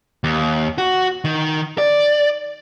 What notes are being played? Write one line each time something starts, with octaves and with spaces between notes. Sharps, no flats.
D#2
F#4
D#3
D5